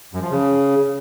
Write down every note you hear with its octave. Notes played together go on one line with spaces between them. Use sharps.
F#2
F3
C#3